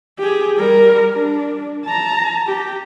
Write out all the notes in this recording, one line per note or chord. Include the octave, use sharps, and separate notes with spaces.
G4 G#4
G3 A#4
D4
A5 A#5
G4